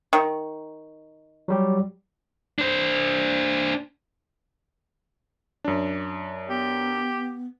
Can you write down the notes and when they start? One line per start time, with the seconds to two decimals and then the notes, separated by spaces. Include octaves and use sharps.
0.13 D#3
1.48 F#3 G3 G4
2.59 D4 C5
5.65 F#2 D4
6.49 B3 G4